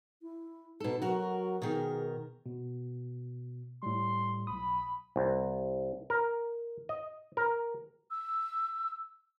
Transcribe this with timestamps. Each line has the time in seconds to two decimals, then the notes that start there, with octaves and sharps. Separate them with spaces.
0.22 E4
0.80 B2 D#4 A4
1.02 F#3 F#4 A#4
1.62 B2 D#3 G#4 A#4
2.46 B2
3.83 A2 G3 C6
4.47 B1 B5 D#6
5.16 C2
6.10 A#4
6.89 D#5
7.37 A#4
8.11 E6